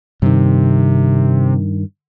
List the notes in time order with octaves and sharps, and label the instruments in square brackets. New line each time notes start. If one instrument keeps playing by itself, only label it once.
[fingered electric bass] G2 D#3 [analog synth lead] C3